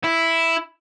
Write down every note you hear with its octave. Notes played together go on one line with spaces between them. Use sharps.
E4